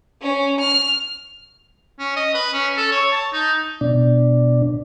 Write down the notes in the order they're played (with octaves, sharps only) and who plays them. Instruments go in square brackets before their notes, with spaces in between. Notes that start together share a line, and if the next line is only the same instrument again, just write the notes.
[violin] C#4
F6
[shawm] C#4
D#5
B4
C#4
A4
C#5
A5
D#4
[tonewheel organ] B2 D4